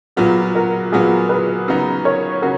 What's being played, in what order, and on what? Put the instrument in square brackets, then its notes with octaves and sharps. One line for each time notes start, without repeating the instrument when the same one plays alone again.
[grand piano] A#2 F#3 B3 [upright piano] F4 G#4
[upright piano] F#4 A#4
[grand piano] A#2 F#3 B3 [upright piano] F4 G#4
[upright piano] G#4 B4
[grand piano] C#3 F#3 B3 D#4
[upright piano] A#4 C#5
[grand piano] C#3 [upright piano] F#4 A#4